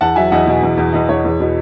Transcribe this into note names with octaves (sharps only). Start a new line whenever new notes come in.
E2 F#5 A5
F#3 E5 G#5
E2 D#5 F#5
B2
E2
E2
E2 D#5
E2 C#5
E2
B2